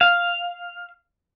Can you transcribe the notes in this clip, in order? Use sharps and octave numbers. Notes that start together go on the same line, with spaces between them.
F5